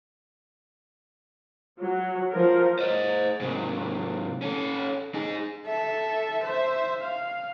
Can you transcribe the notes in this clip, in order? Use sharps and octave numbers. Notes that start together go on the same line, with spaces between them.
F#3
F3 A#4
C5 D#5
G#2 C3
C#4 A4
D#4 G#4
A4 E5
C5 E5
F5